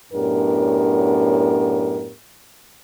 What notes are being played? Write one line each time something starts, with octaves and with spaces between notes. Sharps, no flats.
F#2 A2 B3 D4 G4 A#4